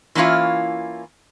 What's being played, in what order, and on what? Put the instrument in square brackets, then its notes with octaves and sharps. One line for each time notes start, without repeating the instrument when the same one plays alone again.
[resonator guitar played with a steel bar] E3 A#3 C#4 E4 F4